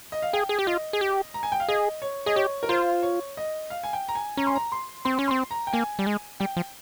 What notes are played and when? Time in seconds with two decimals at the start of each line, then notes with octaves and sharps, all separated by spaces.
0.12 D#5
0.22 F5
0.33 G#4 G5
0.49 G#4
0.59 G4
0.67 F4 D#5
0.93 G#4
1.01 G4
1.34 A#5
1.43 G#5
1.52 G5
1.60 F5
1.69 G#4 D#5
2.02 C#5
2.26 G#4 D#5
2.36 G4 C#5
2.63 A#4
2.69 F4 C5
3.03 C#5
3.37 D#5
3.70 F5
3.83 G#5
3.93 G5
4.09 A#5
4.15 G#5
4.37 C#4 A#5
4.47 C6
4.56 A#5
4.72 C6
5.05 C4 C6
5.19 C#4
5.28 C4 C6
5.51 A#5
5.67 G5
5.73 A#3 G#5
5.99 G3
6.07 G#3
6.40 G3 G5
6.57 F3